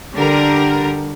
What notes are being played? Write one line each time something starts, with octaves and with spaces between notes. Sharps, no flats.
D3 G3 A#4